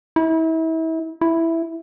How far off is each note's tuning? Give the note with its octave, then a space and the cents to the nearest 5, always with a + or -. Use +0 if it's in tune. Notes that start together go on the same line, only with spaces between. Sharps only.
E4 -35
E4 +0